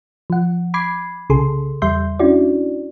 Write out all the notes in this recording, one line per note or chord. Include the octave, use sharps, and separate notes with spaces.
F3 F#5
B5 D6 G#6 C7
C2 C#3 G#4 A4 C6
E2 G3 E5 C6 G6
C#4 D4 E4 F#4 D5